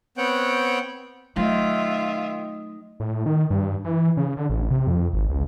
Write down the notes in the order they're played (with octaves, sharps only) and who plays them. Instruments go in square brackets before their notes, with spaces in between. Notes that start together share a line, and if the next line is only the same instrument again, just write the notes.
[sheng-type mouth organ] B3 C4 C#5 F#5 G5
[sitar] D#3 [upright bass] F#3 A3 [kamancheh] F4 E5
[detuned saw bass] A2
D#3
G2
E3
C#3
D3
A1
C3
F2
G#1
C#2